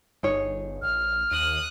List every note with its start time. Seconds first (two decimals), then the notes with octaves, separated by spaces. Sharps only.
0.23 G1 D#4 G#4 C#5
0.82 A#1 F6
1.31 D#2 D#6 F#6